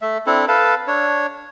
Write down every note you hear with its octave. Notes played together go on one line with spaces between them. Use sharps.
A3 E5
C4 D4 E4 A4
A4 B4 F5 A5
D4 C#5